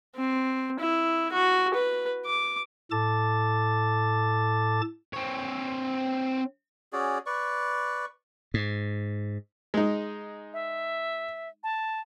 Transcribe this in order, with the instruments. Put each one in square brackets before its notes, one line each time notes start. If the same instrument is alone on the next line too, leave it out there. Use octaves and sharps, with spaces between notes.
[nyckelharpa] C4
E4
F#4
B4
D6
[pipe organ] A2 A4 A5 D6 A6
[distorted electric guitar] C4 C#5
[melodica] C#4 F#4 G#4 D5
B4 D5 C#6
[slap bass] G#2
[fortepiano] G#3 D#4
[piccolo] E5
A5